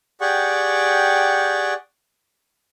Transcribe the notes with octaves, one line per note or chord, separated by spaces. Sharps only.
G4 G#4 D5 F#5 G5 C#6